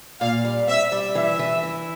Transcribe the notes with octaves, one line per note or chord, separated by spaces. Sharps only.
A#2 F5
G3
C4 E5
G3
E3 E5
E3
E4